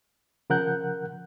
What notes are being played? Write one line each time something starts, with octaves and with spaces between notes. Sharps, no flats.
C#3 F3 A#4 F#5 F#6 G6